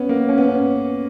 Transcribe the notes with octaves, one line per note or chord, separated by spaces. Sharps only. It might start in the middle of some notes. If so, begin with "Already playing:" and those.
Already playing: B3 C#4
A#3
C#4
B3
C#4